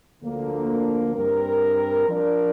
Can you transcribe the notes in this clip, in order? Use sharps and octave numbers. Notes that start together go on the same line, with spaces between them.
D2 D3 F3 A#3
G2 G3 C4 A#4
F3 D4 F4 A#4 D5